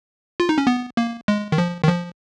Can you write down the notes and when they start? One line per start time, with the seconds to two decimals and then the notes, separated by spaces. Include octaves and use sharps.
0.40 F4
0.49 D#4
0.58 C#4
0.67 B3
0.97 A#3
1.28 G#3
1.52 D#3
1.58 F3
1.84 D#3
1.89 F3